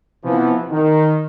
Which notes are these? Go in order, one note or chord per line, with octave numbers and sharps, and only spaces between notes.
C3 E3 F3 B3
D#3